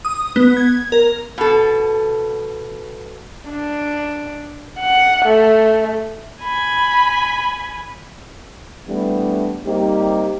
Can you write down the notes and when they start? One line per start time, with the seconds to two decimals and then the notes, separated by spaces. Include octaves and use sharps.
0.05 D#6
0.36 B3
0.57 G#6
0.92 A#4
1.38 B2 A4
3.49 D4
4.79 F#5
5.25 A3
6.43 G#5 B5
8.87 E3 G3 A3 B3 D4
9.65 G3 A#3 C4 D#4 G4